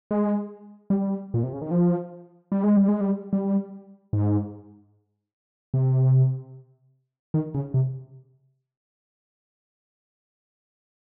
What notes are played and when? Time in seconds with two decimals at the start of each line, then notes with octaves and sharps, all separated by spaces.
0.11 G#3
0.90 G3
1.34 A#2
1.43 C3
1.53 C#3
1.62 D#3
1.71 F3
2.52 G3
2.64 G#3
2.77 G3
2.88 G#3
3.01 G3
3.33 G3
4.13 G#2
5.74 C3
7.34 D#3
7.54 C#3
7.74 C3